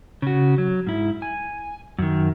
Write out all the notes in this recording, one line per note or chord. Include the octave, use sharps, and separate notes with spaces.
C#3 F#4
F#3
G#2 E4
G#5
F#2 D#3